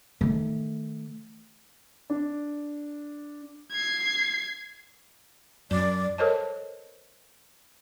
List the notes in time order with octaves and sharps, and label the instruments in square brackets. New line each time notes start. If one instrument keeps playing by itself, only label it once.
[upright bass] D#3 A3
[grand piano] D4
[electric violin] G#6 C7
[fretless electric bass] F#2 [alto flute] D5
[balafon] A4 A#4 C5 C#5 D#5 A5